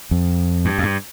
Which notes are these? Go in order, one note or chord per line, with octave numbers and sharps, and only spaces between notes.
F2
G2
F2
G2